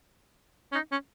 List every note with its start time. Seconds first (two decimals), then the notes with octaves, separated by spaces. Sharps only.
0.72 C#4
0.75 D#4
0.92 C#4